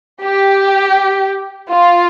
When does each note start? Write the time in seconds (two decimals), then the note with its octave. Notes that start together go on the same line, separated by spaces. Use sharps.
0.23 G4
1.70 F4